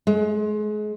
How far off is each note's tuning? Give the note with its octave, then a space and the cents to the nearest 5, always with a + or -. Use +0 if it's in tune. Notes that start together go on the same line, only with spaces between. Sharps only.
G#3 +30